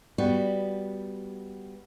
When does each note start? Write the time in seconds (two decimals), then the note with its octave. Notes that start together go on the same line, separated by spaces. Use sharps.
0.18 G3 B3 F#4